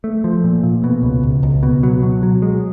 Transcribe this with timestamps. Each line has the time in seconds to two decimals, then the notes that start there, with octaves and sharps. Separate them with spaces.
0.04 A3
0.24 F3
0.44 A#2
0.63 A#2
0.84 B2
1.03 C#2
1.23 C#2
1.43 C#2
1.63 B2
1.83 F#3
2.03 B2
2.23 F#3
2.42 G#3